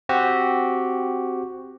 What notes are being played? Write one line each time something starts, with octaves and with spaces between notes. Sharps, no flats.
C4 F#4 G4